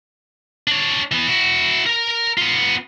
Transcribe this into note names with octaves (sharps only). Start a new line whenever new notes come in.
D4 C#5
E3 B3
E4 F#4
A#4 A#5
B3 F4